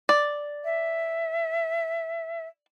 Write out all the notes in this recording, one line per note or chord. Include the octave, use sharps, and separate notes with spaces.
D5
E5